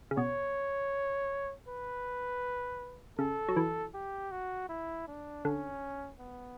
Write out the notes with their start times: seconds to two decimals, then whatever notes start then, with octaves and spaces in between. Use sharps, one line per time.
0.11 C#3
0.17 B2 C#5
1.68 B4
3.18 C#3 A4
3.48 F#3
3.57 E3
3.94 G4
4.31 F#4
4.69 E4
5.07 D4
5.45 D3 C#4
6.20 B3